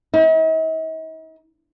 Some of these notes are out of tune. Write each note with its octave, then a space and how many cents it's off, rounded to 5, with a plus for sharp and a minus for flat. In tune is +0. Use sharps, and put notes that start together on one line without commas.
D#4 +45